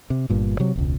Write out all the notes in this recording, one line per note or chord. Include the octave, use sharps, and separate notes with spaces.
C3
G1 G2 A#2
C3 F#3
E1 C#2